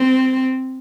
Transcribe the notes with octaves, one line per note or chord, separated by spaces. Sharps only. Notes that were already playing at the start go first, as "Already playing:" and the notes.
Already playing: C4